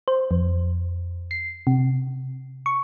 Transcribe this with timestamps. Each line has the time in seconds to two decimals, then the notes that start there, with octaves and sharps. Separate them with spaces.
0.08 C5
0.31 F2
1.31 C7
1.67 C3
2.66 C#6